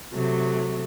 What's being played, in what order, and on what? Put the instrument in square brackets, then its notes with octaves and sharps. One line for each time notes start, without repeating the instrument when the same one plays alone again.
[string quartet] C3 F#3 A3